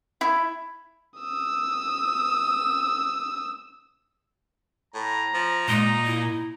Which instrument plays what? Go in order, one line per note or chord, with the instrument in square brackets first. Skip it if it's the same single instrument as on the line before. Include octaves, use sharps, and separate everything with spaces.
[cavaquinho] E4
[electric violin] D#6 E6
[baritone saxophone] A2 [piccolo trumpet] A#5
[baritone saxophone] F3
[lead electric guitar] A#2 [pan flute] G#3 [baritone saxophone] D#4
[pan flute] E4